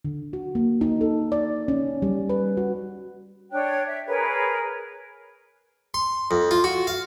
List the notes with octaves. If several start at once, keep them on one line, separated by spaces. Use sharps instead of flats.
D3
F#4
A#3
D#4
A4
D5
C#4
G3
B4
F#4
D4 C#5 G5 F#6
E5
G#4 A#4 B4 C#5
C6
F2
F4
F#4
F5